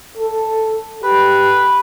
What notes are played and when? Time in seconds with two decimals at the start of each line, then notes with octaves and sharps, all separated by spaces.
0.17 A4
1.04 G4 B4